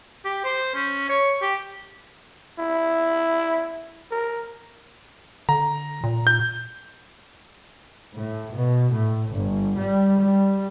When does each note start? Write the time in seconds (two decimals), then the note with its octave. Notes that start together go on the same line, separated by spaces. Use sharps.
0.25 G4
0.45 C5
0.75 C#4
1.09 C#5
1.42 G4
2.59 E4
4.11 A#4
5.49 D3 A#5
6.04 A#2
6.27 G6
8.14 A2
8.52 B2
8.92 A2
9.32 G1
9.77 G3
10.20 G3